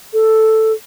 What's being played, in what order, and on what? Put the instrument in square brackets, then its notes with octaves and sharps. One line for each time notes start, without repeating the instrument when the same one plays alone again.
[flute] A4